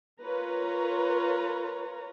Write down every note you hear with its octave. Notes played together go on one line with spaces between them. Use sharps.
F4 A#4 B4 C#5 A#5